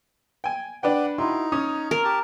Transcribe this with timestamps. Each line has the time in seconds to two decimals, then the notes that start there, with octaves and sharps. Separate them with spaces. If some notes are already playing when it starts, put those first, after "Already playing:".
0.44 G5 G#5
0.83 D4 B4 D5 F#5 G5
1.18 D#4 E4 F#4 C6
1.52 C#4 D#6
1.91 A#4
2.05 G4 A5